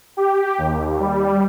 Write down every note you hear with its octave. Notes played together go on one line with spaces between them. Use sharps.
G4
D#2
G3